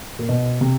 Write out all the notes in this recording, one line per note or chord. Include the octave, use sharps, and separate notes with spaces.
A#2
B2
C3